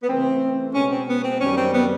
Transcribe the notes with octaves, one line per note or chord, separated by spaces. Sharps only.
B3
C#3 E3 A3 C4
B2 G#3 B3 C#4
C4
B3
C4
F#2 D#3 G3 C#4
C4
B3